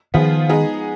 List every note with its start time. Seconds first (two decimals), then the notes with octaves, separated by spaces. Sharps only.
0.14 D#3 F3 B3 F4 G#4
0.49 G#3 B3 D#4 G#4